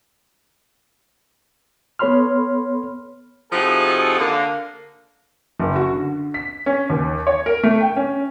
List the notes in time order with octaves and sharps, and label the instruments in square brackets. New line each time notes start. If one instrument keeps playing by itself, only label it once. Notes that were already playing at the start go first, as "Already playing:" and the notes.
[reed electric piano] B3 A4 C#5 B5 C6 F6
[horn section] C3 F3 D#4 F#4 G#4 A4
D3 A#3
[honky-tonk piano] F#1
F#4
D3
B6
C#4
D#2
C#5
A#4
A3
G5
C#4